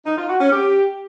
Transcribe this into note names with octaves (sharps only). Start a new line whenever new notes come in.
D#4
F4
F#4
C#4
G4